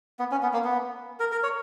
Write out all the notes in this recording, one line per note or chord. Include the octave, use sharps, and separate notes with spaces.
B3
C#4
B3
A#3
B3
A#4
A#4
C#5